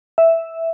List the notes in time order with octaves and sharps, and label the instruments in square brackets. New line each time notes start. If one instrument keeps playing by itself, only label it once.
[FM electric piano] E5